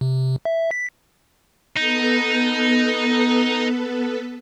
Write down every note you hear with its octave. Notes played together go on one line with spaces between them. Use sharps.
C3
E5
B6
B3 D#4 A4 B4